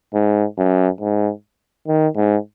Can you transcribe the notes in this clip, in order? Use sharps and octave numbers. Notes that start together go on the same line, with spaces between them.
G#2
F#2
G#2
D#3
G#2